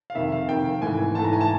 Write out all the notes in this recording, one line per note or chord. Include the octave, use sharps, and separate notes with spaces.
F5
F2 C3 D#3 E5
F5
F2 C3 D#3 G5
G#2 E3 A3 G#5
G#2 E3 A3 A5
A#5
G#5
A5